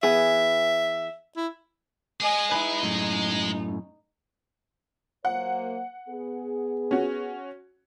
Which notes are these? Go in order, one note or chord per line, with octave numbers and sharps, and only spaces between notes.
E3 B3 G#4 E5
E4
G#3 G#4 D#5 G#5
D#4 E4 B4
F#2 A2
F#3 A#3 C5 F#5
B3 G#4
C#4 F#4